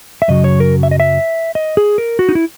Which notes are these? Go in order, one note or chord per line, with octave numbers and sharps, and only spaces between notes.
E5
F#2 C#3 F#3 D#5
C#5
A#4
E5
D#5
E5
D#5
G#4
A#4
F#4
D#4
E4